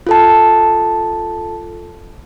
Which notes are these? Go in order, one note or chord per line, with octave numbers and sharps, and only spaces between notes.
F4 A4 A5